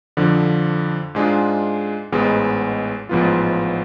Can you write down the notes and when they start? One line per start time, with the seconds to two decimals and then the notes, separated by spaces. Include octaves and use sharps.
0.17 F2 D3 F3
1.15 G#2 G#3 D4 F4
2.12 A1 G#2 G#3 B3
3.09 A1 G#2 F3 B3 F4